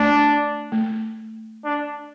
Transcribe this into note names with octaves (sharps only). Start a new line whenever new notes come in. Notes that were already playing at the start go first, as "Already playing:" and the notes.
Already playing: A3 D4
A3
D4